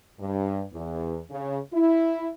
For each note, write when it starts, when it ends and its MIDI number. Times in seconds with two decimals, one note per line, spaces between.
0.19 0.63 43
0.73 1.19 40
1.30 1.59 49
1.73 2.30 64